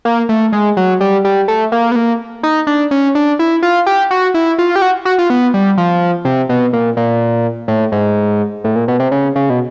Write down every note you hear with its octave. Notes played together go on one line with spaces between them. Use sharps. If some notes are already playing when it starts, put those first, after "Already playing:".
A#3
A3
G#3
F#3
G3
G3
A3
A#3
B3
A#3
D#4
D4
C#4
D4
E4
F4
G4
F#4
E4
F4
G4
F#4
F#4
F4
B3
G3
F3
C3
B2
A#2
A#2
A2
G#2
A2
A#2
B2
C3
C#3
C#3
B2